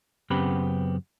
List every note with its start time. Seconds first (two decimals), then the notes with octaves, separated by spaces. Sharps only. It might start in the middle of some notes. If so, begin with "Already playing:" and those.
0.30 F#2 C#3 B3 C4 G4 B5